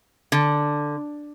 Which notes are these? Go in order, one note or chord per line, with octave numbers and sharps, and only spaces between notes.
D3